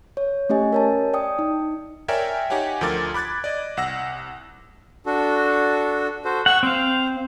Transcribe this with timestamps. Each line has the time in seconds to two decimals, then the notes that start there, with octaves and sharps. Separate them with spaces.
0.17 C#5
0.49 A3 C#4 G4 D#5 G#5
0.73 A#4 C#5 A5
1.13 D5 G5 D#6
1.39 D#4
2.08 A#4 C#5 D5 E5 G5 G#5
2.50 D#4 G4 C#5 F#5 G#5
2.81 D2 F3 A4 A#4 D6 A6
3.14 B5 D6 F#6 G#6 A6
3.44 D5 D#5
3.77 C2 F#5 E6 A#6
5.06 D4 F#4 A4
6.25 F#4 A4 C5
6.46 F#5 C#6 E6
6.63 C4 C5 F5